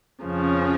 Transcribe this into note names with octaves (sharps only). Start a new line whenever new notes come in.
F2 C#3 F3 C#4